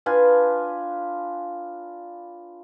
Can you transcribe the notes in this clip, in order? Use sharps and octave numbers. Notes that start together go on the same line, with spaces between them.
D4 F4 B4 G#5